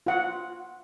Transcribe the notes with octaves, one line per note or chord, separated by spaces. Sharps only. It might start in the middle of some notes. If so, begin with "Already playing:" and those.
F4 F#5